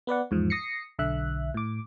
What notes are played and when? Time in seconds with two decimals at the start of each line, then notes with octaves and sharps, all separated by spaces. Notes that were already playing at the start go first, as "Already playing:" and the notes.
0.07 B3 B4 D5 F#5
0.31 E2 G#2 F3
0.50 D#6 A#6 C7 C#7
0.99 B1 D3 E5 F#6
1.54 A2 D6